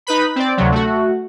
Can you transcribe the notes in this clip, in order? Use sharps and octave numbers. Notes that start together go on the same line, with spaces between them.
D#4 B4 B5
C4 D5
D2 C3 F#3
A3 F#4